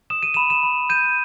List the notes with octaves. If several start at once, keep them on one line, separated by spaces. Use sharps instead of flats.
D#6 E7
D#7
B5 E7
E7
B5
G6 D#7